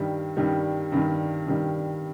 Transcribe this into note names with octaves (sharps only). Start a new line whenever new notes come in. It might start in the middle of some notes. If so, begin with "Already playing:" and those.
Already playing: G2 D#3 G3
G2 D#3 G3
G2 D#3 G3
G2 D#3 G3